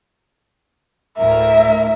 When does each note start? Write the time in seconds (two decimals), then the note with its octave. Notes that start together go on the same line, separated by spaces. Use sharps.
1.18 D2 A2 A#4 E5